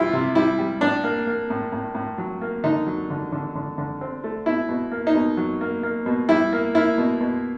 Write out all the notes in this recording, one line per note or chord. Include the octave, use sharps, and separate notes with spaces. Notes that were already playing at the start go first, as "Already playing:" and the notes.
Already playing: C3 E3 G3 E4 F4
C3
G3 E4
G3
A2 D4
A#3
A#3
A2
A2
A2
F#3
A#3
D3 D#4
F#3
D3
D3
D3
D3
C4
A3
B2 E4
B2
A#3
D#4
B2
F#3
A#3
A#3
B2
G3 E4
A#3
A#3 E4
B2
B2